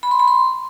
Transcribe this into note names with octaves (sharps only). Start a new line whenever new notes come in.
B5
C6
B5
C6